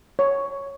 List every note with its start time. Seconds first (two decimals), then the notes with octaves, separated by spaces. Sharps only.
0.19 C#5